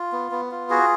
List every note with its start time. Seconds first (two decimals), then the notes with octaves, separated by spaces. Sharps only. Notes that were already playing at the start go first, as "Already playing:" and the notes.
Already playing: F4
0.12 B3
0.32 B3
0.51 F4
0.70 F#4 G#4